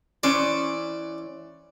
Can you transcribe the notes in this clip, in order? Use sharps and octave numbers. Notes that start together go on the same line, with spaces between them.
E3 C#4 C5 D5